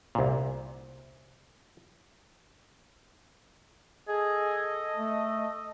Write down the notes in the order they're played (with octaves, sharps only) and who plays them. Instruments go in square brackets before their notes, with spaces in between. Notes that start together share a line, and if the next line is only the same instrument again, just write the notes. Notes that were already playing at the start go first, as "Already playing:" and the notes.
[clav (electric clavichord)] C2 A#2
[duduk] G#4 [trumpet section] A4 D#5
[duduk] A3